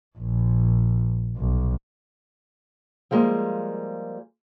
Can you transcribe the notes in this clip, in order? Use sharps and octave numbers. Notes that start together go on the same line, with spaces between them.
A#1
B1
F3 G3 G#3 A#3